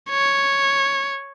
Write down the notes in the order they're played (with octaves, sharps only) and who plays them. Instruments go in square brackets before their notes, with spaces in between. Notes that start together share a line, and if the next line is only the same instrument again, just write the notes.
[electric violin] C#5